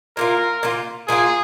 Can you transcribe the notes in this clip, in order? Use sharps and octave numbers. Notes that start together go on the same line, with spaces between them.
A#2 A#3 F4 A#4
A#2 A#3 F4
A#2 A#3 F4 G#4